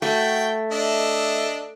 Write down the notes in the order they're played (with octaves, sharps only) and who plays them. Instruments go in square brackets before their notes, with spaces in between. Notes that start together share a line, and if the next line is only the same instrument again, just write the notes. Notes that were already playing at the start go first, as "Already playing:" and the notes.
[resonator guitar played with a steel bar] A3 [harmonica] F#4 G5
[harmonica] D4 D#5 E5